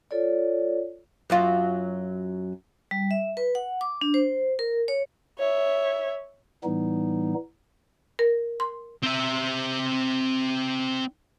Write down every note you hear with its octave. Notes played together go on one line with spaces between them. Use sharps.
F4 A4 C#5 D5
F#2 F#3 F4
G3
E5
B4
F#5
D6
D4
C5
A#4
C#5
C#5 E5
A2 E3 G3 B3 D#4
A#4
C6
C4 E5